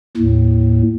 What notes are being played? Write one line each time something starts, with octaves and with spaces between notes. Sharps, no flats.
D#2 A2